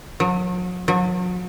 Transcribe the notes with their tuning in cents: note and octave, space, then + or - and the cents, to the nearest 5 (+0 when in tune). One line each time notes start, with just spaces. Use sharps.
F#3 -40
F#3 -40